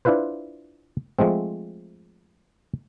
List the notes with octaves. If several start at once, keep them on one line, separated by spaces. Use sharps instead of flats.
D4 E4 F4 B4 C5
F3 G#3 A3 C4